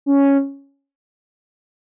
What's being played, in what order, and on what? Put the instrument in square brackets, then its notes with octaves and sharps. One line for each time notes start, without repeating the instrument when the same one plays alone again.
[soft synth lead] C#4